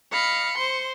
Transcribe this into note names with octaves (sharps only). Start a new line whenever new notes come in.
D#5 F5 B5 C#7
C5 C6